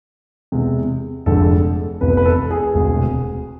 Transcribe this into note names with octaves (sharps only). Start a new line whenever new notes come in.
E2 C3 G#3
F1 F2 D3 G#3 A4
F1 E2 C3 B4
B4
A4
G#4
E1 D2 C3 G#3